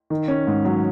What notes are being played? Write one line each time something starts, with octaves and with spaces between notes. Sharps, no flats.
D#3
C#4
G#2
F#3